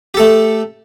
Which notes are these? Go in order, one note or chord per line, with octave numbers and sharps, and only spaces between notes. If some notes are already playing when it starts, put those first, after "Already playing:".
A3 G4 A4